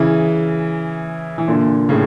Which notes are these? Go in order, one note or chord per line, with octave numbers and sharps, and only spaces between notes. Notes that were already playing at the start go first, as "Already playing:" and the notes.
Already playing: C#3 E3
E3
A#2 D3
A2 C#3